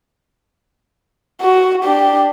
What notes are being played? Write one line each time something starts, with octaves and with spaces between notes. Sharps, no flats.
F#4
D4 G4